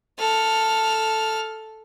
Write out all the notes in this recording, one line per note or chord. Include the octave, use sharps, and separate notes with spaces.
A4 F6